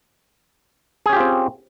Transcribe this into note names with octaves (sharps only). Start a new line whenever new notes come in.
C4 C#4 F4 G4 G#4